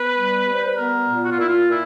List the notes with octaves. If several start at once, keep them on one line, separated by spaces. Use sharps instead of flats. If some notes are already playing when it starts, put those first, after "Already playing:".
Already playing: B3 B4
G3
G3
C5
B4
B3 A#4
A#2
F#4
F4
A#2 E4
F4
A#2 E4